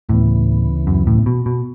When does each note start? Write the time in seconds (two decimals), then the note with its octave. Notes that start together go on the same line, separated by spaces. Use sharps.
0.09 D2 A2 C#3 E3 B3
0.87 F#2
1.07 A2
1.26 B2
1.46 B2